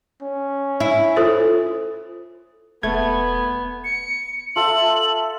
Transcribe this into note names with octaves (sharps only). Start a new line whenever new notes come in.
C#4
E4
F4 A4 C5
E1 A3 B3 G#6
C#7
F4 A4 E5 F#7